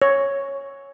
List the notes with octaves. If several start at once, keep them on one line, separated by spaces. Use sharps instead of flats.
C#5